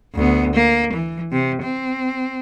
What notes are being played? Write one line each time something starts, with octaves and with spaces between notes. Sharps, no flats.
D2 B3
A#3
E3
C3
C4